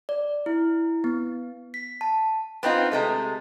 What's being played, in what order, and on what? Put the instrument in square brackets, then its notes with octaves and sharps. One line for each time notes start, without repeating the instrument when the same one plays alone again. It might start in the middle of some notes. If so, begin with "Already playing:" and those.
[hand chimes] D5
E4
B3
B6
A5
[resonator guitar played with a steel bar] B3 C4 D#4 F4
C3 G#3 A3